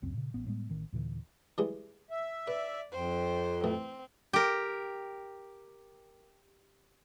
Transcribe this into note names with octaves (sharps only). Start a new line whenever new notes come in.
E1 C#2 F#2 C4
A#2 C#3
A1 B3
A2 G3 G#3 B3
A1 D#3
D#2 A#2 D3 E3
E3 G3 G#3
E5
B4 D5
F2 C5 G5
A1 E3 C4
G4 A#4